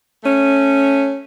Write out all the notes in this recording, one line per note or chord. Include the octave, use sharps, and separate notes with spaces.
A3 C#4